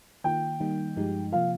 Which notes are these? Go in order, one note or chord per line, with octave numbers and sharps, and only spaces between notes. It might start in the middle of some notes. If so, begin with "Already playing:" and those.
D#3 A#3 F4 G5
D#3 G3 A#3 D#4
G2 F3 G#3 D#4 G4
C3 F3 A#3 F4 F5